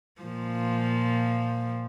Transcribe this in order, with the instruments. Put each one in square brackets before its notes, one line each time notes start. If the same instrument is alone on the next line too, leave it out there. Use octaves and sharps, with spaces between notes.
[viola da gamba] A#2 F3